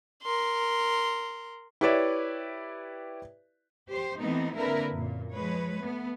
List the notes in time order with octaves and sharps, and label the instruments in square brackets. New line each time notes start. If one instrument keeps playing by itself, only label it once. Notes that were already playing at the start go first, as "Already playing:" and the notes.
[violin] A#4 C6
[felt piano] E4 G4 B4 C#5 D5 E5
[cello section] G4 C5
E3 A3 B3 C4 D#4
D3 A#3 C4 E4 A#4 B4
F#2 A#2
F3 G#3 B4 C#5
A3 B3